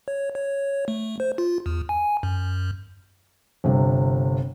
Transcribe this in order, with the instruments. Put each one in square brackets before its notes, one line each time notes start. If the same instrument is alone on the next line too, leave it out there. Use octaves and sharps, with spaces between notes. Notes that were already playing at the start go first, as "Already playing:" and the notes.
[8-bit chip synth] C#5
C#5
C#5
A3
C5
F4
E2
G#5
F#2
[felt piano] G1 C3